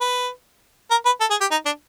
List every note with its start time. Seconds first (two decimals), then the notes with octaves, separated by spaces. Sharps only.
0.01 B4
0.91 A#4
1.06 B4
1.21 A4
1.31 G#4
1.41 G4
1.51 D#4
1.66 D4